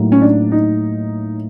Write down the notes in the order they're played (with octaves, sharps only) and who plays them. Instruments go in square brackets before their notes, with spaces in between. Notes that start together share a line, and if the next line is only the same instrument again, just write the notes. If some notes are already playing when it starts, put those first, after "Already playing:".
Already playing: [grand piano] A2 F#3 A#3 D#4
[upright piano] C#4
D4
D#4